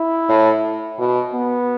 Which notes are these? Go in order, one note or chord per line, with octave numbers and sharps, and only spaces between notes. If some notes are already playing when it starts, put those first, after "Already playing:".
Already playing: E4
A2
B2
B3